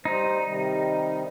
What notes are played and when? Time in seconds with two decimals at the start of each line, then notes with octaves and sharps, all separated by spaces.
0.05 G3 D#4 C5
0.45 C3 D#3 G3